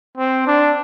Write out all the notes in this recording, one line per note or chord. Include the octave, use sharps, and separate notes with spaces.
C4
D4